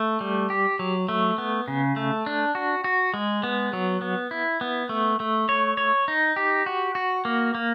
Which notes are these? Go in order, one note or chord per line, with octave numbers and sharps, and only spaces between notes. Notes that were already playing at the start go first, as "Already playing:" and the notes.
Already playing: A3
G3
G4
F#3
A3
B3
C#3
A3
D4
F#4
F#4
G#3
B3
F#3
B3
E4
B3
A3
A3
C#5
C#5
D#4
G4
F#4
F#4
A#3
A#3